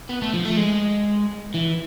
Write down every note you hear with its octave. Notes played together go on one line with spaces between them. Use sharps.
B3
A3
F3
A3
G#3
E3